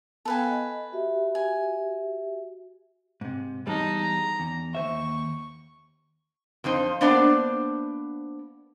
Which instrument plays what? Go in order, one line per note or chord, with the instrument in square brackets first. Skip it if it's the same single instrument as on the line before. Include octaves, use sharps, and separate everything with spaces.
[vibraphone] B3 F5 G5 [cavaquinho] A4 B4 G#5
[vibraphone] D#5
F#4 G4 E5
[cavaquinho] G#5
[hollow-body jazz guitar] G#2 C3
[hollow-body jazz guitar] E2 G3 G#3 [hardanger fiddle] D#4 A5
[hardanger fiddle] A#5
[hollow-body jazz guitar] E2
[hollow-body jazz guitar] D#2 C5 E5 [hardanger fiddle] C#6
[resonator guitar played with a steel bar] F2 F3 D#4 C5
A#3 B3 D4 C5 D5 A5